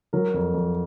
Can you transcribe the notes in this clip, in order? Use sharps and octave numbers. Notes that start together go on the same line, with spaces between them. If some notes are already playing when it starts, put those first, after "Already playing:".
F#3 A#4
F2
F2